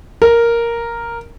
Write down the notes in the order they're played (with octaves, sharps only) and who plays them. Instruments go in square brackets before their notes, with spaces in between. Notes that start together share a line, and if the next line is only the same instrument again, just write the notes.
[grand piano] A#4